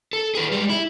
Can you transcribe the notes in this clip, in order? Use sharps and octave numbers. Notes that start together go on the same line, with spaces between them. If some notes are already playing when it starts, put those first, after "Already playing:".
A4
G#4 B4
G3 G#3
E4